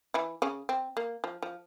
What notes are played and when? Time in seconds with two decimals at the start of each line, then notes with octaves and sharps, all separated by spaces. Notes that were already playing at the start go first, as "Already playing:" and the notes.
0.14 E3 E4
0.42 C#3 C#4
0.69 C4
0.97 A#3
1.24 F3
1.42 F3